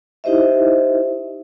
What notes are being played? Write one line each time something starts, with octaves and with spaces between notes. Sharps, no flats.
D#4 E4 G4 C5 D#5 E5